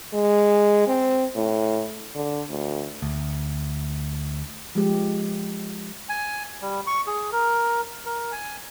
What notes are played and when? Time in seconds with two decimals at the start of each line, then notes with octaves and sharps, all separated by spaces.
0.13 G#3
0.87 C4
1.36 A2
2.15 D3
2.49 D2
3.02 D2
4.75 F3 G#3 G4
6.09 G#5
6.62 G3
6.87 C#6
7.07 G#4
7.32 A#4
8.06 A#4
8.32 G#5